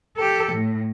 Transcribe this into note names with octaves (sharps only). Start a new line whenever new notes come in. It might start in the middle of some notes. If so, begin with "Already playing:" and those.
G4 A4
A2